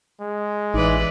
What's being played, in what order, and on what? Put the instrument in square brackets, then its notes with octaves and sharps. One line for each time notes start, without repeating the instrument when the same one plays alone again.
[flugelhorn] G#3
[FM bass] A1 [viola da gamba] E3 B4 D5 [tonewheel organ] D#4